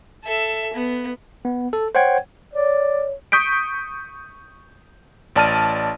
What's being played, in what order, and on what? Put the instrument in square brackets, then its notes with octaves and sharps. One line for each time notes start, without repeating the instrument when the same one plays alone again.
[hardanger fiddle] A4 E5
B3
[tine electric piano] B3
A4
C5 C#5 F#5 G5 G#6
[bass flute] C#5 [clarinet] D5
[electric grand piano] C#6 D#6 G6 B6 D7
A1 D5 A5 F6 D#7